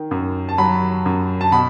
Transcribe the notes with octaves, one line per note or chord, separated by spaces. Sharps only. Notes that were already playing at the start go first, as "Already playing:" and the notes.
Already playing: D#3
F#2
A5
F#3 B5
F#2
A5
B2 B5